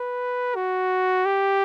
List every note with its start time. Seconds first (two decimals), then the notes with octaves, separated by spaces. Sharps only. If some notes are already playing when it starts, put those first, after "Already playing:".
Already playing: B4
0.56 F#4
1.25 G4